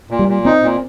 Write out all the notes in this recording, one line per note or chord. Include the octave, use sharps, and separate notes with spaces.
A#2
G3
A#2
C4 D#4
A#2